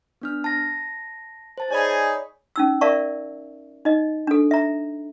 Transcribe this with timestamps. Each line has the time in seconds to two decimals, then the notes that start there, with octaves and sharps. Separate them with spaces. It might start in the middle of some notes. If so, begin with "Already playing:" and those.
0.21 B3 D4 F6
0.44 A5 A#6
1.58 C5 A5 A6
1.70 D#4 G#4 C#5 D5 G#5 B5
2.56 C#4 D#4 E6
2.81 A#4 D5 E5 F5 A5 C#6
3.85 D#4 D#5
4.27 D4 A4
4.51 E5 A#5